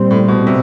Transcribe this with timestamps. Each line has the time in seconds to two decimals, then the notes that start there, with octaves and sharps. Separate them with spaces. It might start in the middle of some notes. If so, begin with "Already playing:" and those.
Already playing: A#2 G3 C4
0.11 A2
0.28 B2
0.47 C3